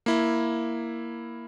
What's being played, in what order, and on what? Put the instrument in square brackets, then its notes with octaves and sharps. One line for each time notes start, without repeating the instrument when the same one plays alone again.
[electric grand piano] A#3 E4